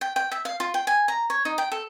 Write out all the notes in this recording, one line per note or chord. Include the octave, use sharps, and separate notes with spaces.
G5
G5
E5
F5
F4
G5
G#5
A#5
C#5
D#4
G5
A4